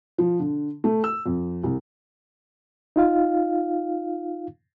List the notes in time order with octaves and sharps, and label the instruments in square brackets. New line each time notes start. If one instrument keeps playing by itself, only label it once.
[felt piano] F3
D3
A3
E6
F2
C2
[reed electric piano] D#4 F4 F5